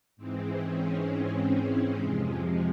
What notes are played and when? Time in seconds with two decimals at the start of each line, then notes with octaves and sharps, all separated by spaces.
0.17 G#2 E3 G#3 C4
0.62 C#4
1.98 F2 C3 F3 G#3